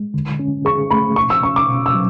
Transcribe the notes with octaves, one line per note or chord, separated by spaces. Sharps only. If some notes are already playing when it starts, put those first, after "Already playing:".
Already playing: G#3
D3
C#4
G#4 C#6
A3 B5
B2 C#6
E6
C#4 C#6
D6
B2
E6
F#3